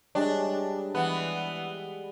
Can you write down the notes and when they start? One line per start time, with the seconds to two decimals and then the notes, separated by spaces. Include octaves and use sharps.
0.15 G3 G#3 D4 C#5
0.95 E3 B3 F#5